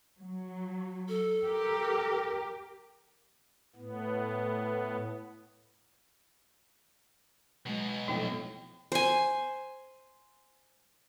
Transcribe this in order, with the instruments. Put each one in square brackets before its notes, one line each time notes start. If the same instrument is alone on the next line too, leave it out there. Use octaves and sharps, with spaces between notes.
[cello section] F#3
[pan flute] A4
[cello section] G4 A#4
[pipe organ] A2 B3
[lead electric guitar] B2 F#3 [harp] G#3 B4
[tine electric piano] B1 F2 A2 [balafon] D#4 G5
[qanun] C5 G#5